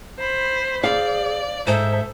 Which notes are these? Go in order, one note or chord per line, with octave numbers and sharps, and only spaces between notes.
C5 B5
G#4 C5 D5 F5
G#2 A4 C5 E5